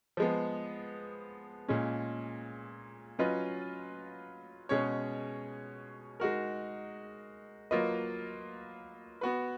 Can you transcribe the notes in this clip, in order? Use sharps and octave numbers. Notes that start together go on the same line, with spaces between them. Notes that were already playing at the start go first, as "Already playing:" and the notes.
F3 G#3 B3
A#2 G#3 C#4
F#3 C#4 F4 B4 D#5
B2 G#3 C#4 G#4 C#5
G#3 D#4 F#4 A#4
F#3 A#3 F4 B4 D#5
B3 F#4 B4